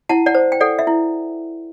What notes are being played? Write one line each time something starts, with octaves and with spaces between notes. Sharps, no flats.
E4 F#5 A5
D5 F#5
C5
G5
A4 D5 F#5
E5
E4